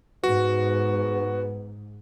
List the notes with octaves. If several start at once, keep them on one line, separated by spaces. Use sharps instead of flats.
G#2 B3 F#4